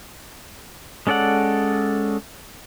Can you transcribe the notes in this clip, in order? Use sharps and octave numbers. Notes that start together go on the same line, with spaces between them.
G#3 C#4 A4 D5 F#5